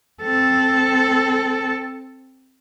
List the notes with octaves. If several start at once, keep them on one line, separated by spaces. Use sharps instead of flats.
C4 A4